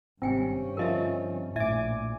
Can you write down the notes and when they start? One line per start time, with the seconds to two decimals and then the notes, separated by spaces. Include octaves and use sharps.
0.22 G#1 G2 C3 C4 C#4 F4 G5 G#5
0.77 D3 F3 D#4 A#4 D#5 E5
1.56 A#1 A2 E5 G#5 D6